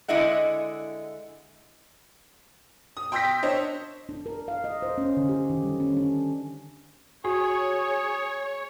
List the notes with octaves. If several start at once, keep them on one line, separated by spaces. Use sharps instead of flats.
D3 G#3 E4 D#5 E5 F#5
D#6
G5 C6 E6 G6 A#6 B6
D4 C5 C#5 D#5
D4
A#4
F5
D#5
C5
C#4
D3
G4
D#3
G3
C#4
D4
F#4 G#4 C#5